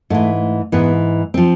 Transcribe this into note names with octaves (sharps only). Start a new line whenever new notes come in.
G#2 E3 A3
G#2 E3 B3
F3 C4